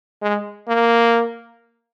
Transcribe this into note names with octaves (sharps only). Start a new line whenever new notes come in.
G#3
A#3